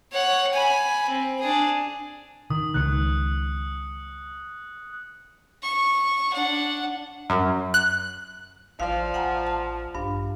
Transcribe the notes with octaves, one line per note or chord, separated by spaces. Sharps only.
C#5 F#5
G#5 B5
C4
D4 G#4
D#3 D#6
C#2 D#3 F#6 C#7
C#6
D4 F#5
F#2
F#6
A1 F3 D5 F5
A1 F#5 G#5 A#5
A5
A#1 G2 D4 F5